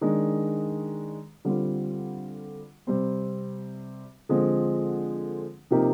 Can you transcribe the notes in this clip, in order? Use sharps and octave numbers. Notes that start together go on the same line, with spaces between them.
D#3 G#3 D4
D3 G3 C4 F4
C3 G3 C4
D3 F3 G#3 C4
C3 F3 A#3 D#4 G4